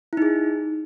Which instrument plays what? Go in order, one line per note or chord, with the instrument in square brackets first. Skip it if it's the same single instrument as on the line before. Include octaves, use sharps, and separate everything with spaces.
[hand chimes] E4
D#4
G#4